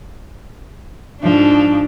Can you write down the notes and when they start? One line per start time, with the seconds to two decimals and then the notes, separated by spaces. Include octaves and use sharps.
1.21 G#2 F3 D4